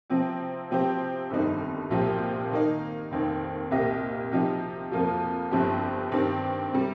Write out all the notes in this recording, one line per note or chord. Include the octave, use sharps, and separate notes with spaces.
C3 F3 C4
C3 F3 C4 G4 C5
G1 F2 D#3 G3 D#4
C2 A#2 F3 C4 G4
D#3 A#3 D#4
F1 D#2 D#3 C4
C2 A#2 A#3 G4 D#5
C3 F3 D#4 G4
F2 F3 A#3 F4
G1 G2 F3 C4 G4
G2 D#3 C4 G4
C3 G3